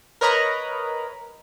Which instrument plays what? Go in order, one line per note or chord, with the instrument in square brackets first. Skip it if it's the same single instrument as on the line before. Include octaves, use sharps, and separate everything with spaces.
[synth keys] A#4 B4 C#5 D#5 A#5 B5